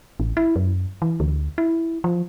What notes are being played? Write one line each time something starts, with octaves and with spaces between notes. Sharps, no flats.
A1
E4
F#2
E3
D2
E4
F3